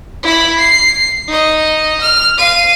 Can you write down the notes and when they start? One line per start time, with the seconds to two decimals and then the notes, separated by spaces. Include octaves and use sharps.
0.23 E4 B5
0.58 C7
1.28 D#4 D#5
2.00 F6
2.37 F5 D#7